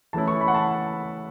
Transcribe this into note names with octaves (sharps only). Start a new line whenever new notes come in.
E3 A3 C#4 E4 A5
C#6
B5
F#5
A5